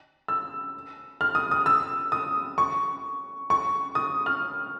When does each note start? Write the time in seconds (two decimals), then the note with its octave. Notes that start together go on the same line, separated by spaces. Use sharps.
0.28 E6
1.21 F6
1.35 D#6
1.51 D#6
1.66 E6
2.12 D#6
2.58 C#6
3.50 C#6
3.95 D#6
4.26 F6